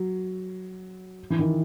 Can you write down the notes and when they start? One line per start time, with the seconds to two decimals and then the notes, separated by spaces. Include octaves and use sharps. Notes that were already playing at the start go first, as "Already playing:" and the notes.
Already playing: F#3
1.30 E3
1.39 D#3